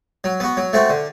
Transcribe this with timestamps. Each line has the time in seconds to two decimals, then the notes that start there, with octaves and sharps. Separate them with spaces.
0.24 F#3
0.40 B3 F#4
0.57 F#3
0.73 A3 C4 F#4
0.90 D3